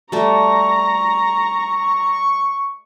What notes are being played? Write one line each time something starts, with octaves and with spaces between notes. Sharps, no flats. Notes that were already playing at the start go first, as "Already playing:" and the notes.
G3 A3 A#5 C#6